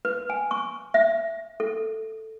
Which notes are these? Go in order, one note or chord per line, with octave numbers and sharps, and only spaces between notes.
B4
G#5
C#6
E5
A4